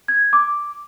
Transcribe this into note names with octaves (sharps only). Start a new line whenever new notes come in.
G#6
D6